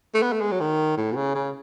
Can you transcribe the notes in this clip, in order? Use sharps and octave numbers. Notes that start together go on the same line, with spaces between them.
A3
B3
A3
G#3
F#3
D#3
A2
B2
C#3
C#3